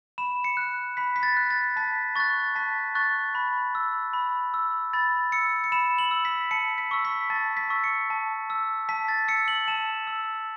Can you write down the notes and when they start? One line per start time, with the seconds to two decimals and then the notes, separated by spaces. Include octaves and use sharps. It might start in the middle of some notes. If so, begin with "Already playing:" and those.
0.18 B5 E7
0.44 C#7
0.57 F#6
0.97 B5 B6
1.16 B6
1.23 A6
1.37 F#6
1.50 A6
1.76 A5 B6
2.16 C#6 F#6 A6
2.55 A5 B6
2.95 C#6 F#6 A6
3.35 B5
3.75 E6
4.13 B5
4.54 E6
4.93 B5 A6
5.32 E6 C#7
5.64 C#7
5.72 B5 E7
5.98 F#7
6.11 E6
6.25 B6
6.51 A5 C#7
6.78 B6
6.91 C#6 E6
7.05 B6
7.30 A5 A6
7.57 B6
7.70 C#6 E6
7.84 C#7
8.10 A5
8.50 E6
8.89 A5 B6
9.08 A6
9.28 E6 C#7
9.48 F#7
9.68 A5 E7
10.07 E6